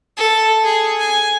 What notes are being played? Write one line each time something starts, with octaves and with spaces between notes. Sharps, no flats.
A4
G#4
G#5